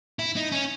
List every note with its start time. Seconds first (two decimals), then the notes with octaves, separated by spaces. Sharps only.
0.19 E4
0.36 D#4
0.52 C#4